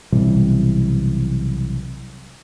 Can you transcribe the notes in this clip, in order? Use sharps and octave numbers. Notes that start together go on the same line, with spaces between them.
B1 C3 E3 G3